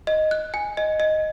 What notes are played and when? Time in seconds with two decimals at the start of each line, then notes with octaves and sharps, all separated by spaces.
0.07 D#5
0.31 F#6
0.54 G#5
0.77 D#5
1.00 D#5